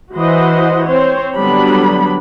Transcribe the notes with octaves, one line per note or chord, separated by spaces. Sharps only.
E3 F#4 C5 D#5 F#5
C4 C5 C#5
D3 F#3 G3 B3 D4 B5